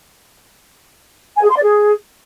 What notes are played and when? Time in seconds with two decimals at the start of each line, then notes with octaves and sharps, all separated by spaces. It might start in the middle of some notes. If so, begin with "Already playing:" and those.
1.35 G#5
1.42 G#4
1.49 C6
1.55 D5
1.62 G#4